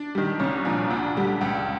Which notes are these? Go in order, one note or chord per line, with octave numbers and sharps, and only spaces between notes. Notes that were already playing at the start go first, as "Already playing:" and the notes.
Already playing: D4
D#3 G3
C2 C#4
A#2 F3 D4
D2 D4
D3 G3
C#2